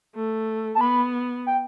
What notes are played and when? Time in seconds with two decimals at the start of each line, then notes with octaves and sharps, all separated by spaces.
0.15 A3
0.75 A5
0.80 B3 B5
1.46 G5